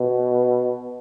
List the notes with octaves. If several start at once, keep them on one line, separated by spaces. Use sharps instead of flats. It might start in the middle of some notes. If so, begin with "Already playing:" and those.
Already playing: B2